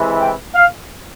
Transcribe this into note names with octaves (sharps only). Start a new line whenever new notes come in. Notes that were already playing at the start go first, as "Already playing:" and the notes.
Already playing: C3 E3 G#3 E4
G5
F5